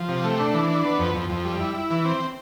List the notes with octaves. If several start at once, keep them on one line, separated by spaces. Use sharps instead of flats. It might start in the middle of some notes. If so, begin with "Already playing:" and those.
Already playing: F3
C3
A3
D4
E3
D4
B3
F2
F2
F2
G3
E4
E4
E3
C4